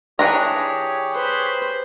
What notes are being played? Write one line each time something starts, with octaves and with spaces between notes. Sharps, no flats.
E3 D4 G4 G#4 C#5 A#5
B4 C5